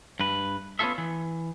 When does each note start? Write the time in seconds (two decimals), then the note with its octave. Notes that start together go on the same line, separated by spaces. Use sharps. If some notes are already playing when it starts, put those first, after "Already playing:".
0.20 G2 B4
0.79 B3 C#4 D4 F4 A4 E5
0.98 E3